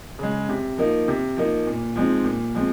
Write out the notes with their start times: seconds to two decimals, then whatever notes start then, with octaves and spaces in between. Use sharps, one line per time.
0.19 C#3 G#3
0.49 C3
0.78 F3 A#3 D#4
1.08 C3
1.37 F3 A#3 D#4
1.67 A#2
1.96 F3 G#3 C4 D#4
2.25 A#2
2.55 F3 G#3 C4